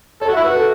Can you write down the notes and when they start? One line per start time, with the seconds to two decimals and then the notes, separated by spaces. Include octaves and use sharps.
0.21 A4 C#5
0.29 F#4
0.33 E4 E5
0.44 F#4 B4
0.55 A4